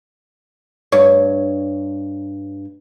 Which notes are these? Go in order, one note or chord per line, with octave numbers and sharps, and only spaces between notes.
G2 C#5